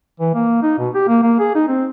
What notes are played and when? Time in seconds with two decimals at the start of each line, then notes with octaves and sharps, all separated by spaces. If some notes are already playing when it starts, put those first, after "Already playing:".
0.20 E3
0.35 A#3
0.63 D#4
0.78 B2
0.95 G4
1.08 A#3
1.23 A#3
1.39 G#4
1.55 D#4
1.68 C4